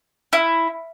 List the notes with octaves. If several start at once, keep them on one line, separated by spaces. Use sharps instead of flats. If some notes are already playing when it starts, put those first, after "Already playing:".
E4